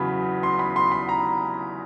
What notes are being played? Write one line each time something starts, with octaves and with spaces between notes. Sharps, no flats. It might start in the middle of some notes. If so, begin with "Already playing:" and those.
Already playing: E2 C#3 F#3 B3 B5
C6
B5
C6
B5
A#5